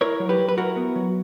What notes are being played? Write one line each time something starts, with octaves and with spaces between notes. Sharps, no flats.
E4 A#4 C#5
F#3
G4 B4
F#3
B4
E4 F#4 A#4
B3
F#3